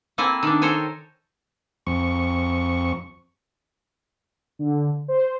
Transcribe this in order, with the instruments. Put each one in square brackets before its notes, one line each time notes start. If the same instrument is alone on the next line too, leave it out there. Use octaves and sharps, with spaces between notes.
[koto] A#3 C4 E4 A4 G#5
D#3 D4
A4 A#4 C5 C#5 G5 G#5
[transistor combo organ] F2 C#6
[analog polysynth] D3
C5